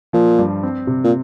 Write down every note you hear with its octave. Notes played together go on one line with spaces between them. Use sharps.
A#2 F3
G2
C4
C3
A#2